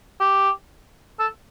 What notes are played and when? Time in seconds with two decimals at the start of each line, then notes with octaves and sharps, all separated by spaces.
0.20 G4
1.19 A4